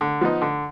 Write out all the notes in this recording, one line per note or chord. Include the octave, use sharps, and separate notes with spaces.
D3
F3 B3 D#4
D3